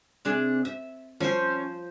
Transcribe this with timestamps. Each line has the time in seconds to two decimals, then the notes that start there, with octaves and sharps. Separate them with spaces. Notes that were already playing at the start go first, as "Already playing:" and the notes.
0.25 C3 D4 G#4
0.65 E5
1.20 F3 C#4 C5